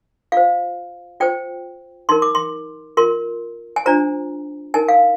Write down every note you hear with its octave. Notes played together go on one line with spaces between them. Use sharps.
F4 C5 F5
F4 C5 G5
D#4 A#4 C6
D6
C6
F4 A#4 C6
G#5
D4 F4 C5 A#5
D#4 A#4 G#5
F5